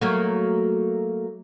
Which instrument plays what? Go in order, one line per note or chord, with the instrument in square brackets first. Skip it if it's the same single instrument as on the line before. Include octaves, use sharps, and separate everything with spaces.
[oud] F#3 A3 A#3